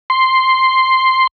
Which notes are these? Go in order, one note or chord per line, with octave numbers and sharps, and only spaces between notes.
C6